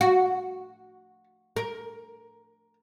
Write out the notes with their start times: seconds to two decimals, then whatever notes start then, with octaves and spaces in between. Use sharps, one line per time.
0.01 F#4
1.56 A#4